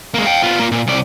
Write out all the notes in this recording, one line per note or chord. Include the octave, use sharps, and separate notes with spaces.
G#3 A#3
F5 G5
B3 F4
A#3 F4
A#2
C2 D5